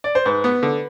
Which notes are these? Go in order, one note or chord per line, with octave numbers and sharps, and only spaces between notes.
D5
C5
G#2 B4
B3
D3